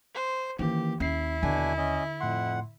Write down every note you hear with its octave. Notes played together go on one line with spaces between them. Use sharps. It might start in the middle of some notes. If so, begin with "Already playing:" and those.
C5
D#3 E3 A#3 C#4 G4
D#2 C#4 E4 C7
B2 D3 D4 G#5
C#4 D#5
F2 A2 F#5 C6